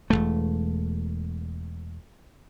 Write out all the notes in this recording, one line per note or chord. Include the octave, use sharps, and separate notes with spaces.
E1 C#2 A3